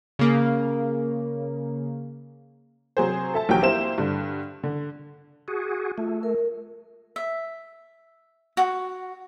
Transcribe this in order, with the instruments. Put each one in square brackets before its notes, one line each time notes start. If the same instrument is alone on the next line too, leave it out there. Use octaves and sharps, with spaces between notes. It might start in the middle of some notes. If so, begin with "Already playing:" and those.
[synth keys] C#3 A#3
[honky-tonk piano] C3 F#3 G#4 C5
A4 E5 A5
A#1 D#3 F#3 G4 G5
A#3 C4 E4 G4 C5 E7
G2 D3
D3
[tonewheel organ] F#4 G#4
[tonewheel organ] A3 [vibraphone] F4
[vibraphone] A#4
[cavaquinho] E5
F#4